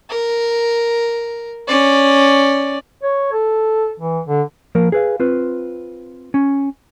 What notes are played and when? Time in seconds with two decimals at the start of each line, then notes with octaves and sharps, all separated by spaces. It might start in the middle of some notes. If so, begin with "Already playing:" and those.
0.10 A#4
1.68 C#4 D5
3.03 C#5
3.32 A4
4.00 E3
4.28 D3
4.75 F3 A#3 A#4
4.92 G#4 B4 F5
5.20 C4 F4 B4
6.34 C#4